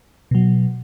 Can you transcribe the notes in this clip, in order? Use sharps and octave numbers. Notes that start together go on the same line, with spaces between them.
B2 F#3